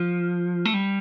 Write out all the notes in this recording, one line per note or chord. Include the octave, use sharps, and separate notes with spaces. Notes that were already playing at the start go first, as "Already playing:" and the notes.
Already playing: F3
A3
G3